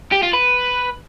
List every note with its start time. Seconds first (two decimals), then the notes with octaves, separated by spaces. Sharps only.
0.12 G4
0.23 F4
0.34 B4